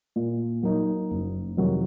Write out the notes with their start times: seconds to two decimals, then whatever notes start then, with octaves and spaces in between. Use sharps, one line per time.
0.16 A#2
0.63 F#3 A#3 D#4
1.11 F#1
1.57 F2 C3 D#3 F#3